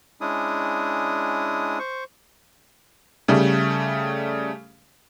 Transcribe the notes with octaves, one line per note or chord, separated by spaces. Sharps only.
G#3 C#4 D4 E4 D#6
C5 C#6
C#3 G3 A3